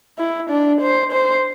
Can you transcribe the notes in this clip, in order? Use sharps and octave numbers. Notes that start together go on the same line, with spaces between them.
E4
D4
C5
C5